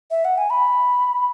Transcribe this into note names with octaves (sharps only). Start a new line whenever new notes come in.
E5
F#5
G#5
B5